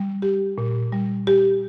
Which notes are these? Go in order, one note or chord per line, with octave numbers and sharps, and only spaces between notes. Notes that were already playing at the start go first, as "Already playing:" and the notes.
Already playing: G3
G4
A#2
G3
G4